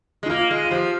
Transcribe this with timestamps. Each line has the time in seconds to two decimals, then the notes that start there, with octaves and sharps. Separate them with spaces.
0.23 G#3
0.26 D#4
0.30 A#3 F4
0.51 G#3
0.65 F4
0.71 F3 G4